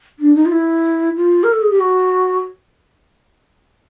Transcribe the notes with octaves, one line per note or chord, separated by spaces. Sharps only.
D4
D#4
F4
E4
F4
A#4
A4
G#4
G4
F#4